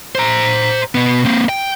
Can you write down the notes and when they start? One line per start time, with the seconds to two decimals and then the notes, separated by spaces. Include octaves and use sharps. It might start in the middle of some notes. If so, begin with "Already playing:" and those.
0.15 C5 A#5
0.95 B2 B3
1.25 A#3 C4
1.49 G5